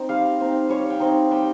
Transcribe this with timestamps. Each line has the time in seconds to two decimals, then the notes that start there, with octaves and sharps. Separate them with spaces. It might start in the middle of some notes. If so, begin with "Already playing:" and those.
Already playing: C4 D#4 G5
0.09 G3 F5
0.40 C4 D#4
0.69 G3 C#5
0.90 G5
1.00 C4 D#4
1.31 G3 G5